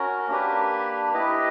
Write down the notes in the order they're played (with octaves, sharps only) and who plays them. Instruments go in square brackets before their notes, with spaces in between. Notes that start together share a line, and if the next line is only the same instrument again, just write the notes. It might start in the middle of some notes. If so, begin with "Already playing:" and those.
Already playing: [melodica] C#4 F#4 A#4
A#3 D4 G4 B4
E4 G4 B4 D#5